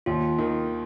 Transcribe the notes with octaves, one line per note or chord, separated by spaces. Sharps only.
D#2 F4
D#3